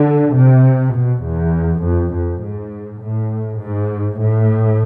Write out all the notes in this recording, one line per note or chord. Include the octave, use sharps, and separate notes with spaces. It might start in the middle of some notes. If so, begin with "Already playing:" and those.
Already playing: D3
C3
B2
E2
F2
F2
G#2
A2
G#2
A2